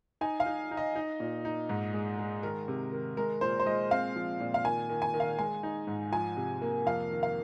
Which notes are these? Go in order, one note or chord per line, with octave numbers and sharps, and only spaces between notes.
D#4 G#5
F5
D#4
D#4
D#5
D#4
A#2
D#4
G#2
G#3
G#3
D#3 A#4
C3
D#3
G#3 A#4
A#2 C5
C5
G#3 D#5
C4 F5
F3
A#2
F5
D#3 G#5
D#3
G#5
D#3
F5
G#3 G#5
D#4
G#2
F3 G#5
C3
A#3
F2 F5
D#3
F5